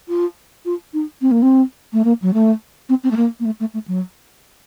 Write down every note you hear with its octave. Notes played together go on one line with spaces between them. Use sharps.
F4
F4
D#4
C4
A#3
C4
A3
A#3
F#3
A3
C4
C4
A3
A#3
A#3
A3
A3
A3
F#3